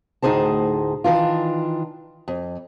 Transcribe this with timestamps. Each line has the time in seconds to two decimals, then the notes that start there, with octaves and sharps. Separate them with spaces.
0.22 D2 A2 D#4 G#4 C5 A5
1.04 D#3 E3 D4 F4
2.28 F2